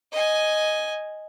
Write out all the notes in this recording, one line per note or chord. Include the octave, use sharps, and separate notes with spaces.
D#5 G#5